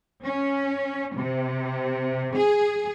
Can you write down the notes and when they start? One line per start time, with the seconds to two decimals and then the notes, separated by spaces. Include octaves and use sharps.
0.25 C#4
1.17 C3
2.36 G#4